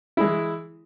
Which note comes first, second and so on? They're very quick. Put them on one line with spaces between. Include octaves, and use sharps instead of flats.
E4 G#3 E3